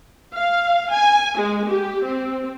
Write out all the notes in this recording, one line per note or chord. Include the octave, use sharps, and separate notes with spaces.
F5
G#5
G#3
G4
C4